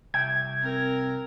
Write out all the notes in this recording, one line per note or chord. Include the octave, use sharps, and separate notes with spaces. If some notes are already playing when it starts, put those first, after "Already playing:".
C2 E5 G5 G#6
C4 A#4